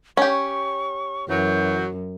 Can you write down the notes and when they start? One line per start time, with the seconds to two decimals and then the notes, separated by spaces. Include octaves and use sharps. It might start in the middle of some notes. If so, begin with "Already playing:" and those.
0.17 C#4 G4 C#6
1.29 F#2 E3 F#3 G6